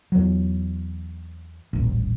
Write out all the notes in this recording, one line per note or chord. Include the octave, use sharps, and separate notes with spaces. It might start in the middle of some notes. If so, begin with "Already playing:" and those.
E2 F#3
D#1 A1